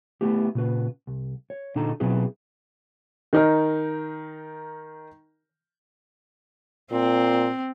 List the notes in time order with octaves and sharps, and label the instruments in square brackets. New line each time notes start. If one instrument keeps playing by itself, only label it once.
[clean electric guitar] A3 B3 E4 G4
A#2 C#3 B4
C2
C#5
A#2 D3 D4 D#4 A4 A#5
B2 F#3 C4 E4 G#4 B4
[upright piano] D#3 D#4 A#4
[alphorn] A#2 [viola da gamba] C4